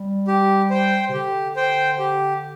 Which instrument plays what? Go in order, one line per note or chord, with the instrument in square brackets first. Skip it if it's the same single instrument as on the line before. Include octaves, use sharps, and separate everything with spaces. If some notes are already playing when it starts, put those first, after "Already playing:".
Already playing: [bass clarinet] G3
[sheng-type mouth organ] G4
C5 G5
[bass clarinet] C3
[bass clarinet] D3 [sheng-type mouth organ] G4
[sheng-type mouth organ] C5 G5
G4